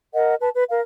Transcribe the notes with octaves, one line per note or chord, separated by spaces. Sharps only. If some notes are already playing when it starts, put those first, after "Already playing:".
A#4 D#5 F#5
B4 A5
B4
A#4 F5